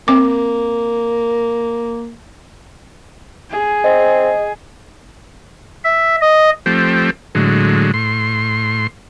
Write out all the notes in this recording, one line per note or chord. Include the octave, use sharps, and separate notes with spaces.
A#3 C4 D6
G#4
C4 D#5
E5
D#5
F3 A3 C4 G4
A2 D3 F#3 G#3
A2 C6